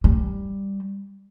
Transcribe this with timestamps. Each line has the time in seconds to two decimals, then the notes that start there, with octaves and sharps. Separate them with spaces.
0.04 G3